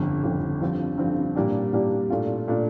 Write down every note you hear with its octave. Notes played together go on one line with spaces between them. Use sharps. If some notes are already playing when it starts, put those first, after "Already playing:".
Already playing: G1 F2 D3
G1 F2 D3
G2 D3 F3 C4
G2 D3 F3 C4
A#2 G3 A#3 D4 G4
A#2 G3 A#3 D4 G4
A#2 A3 D4 F4
A#2 A3 D4 F4